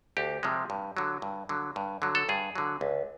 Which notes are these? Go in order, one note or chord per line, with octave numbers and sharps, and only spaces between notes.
D2 G4
C3 F3 G#3
G2
D3 F#3
G2
D3 F#3
G2
D3 F#3
A4
G2 G#4
D3 F#3
C#2